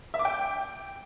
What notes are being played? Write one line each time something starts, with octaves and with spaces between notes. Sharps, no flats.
E5
D6
G5